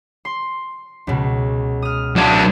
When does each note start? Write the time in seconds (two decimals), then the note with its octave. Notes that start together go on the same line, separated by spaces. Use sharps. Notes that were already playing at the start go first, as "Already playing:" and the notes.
0.25 C6
1.07 C#2 B2
1.82 D#6 F6
2.16 F#3 D4 D#6 G#6